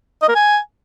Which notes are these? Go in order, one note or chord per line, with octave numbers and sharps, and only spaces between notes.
D#5
A#4
G#5